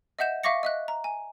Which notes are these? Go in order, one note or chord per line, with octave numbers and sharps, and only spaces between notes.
D#5 E5 F#5 G6 E7
E5 F5 C#6 D6 A#6 C#7
D#5 E5 F#6
A#5
G#5